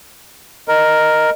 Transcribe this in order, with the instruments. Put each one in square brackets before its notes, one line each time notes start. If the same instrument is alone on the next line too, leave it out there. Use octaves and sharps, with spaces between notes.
[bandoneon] A#4 [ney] D#5